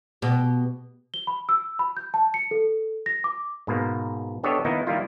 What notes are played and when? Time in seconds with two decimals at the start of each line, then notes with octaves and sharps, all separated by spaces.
0.22 B2 G4
1.14 G7
1.27 B5
1.49 E6
1.79 B5
1.97 G6
2.14 A5
2.34 C#7
2.51 A4
3.06 A#6
3.24 D6
3.67 G#2 B2 A#3
4.43 B3 D4 G4 A4 C#5 D#5
4.65 D#3 A#3 B3 D#4 E4
4.87 D#3 G3 A#3 E4 F4